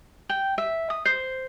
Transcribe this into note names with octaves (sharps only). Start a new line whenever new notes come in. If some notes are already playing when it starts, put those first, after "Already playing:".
G5
E5
D#6
C5